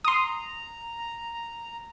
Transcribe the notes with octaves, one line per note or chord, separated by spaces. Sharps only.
A#5 C6 D#6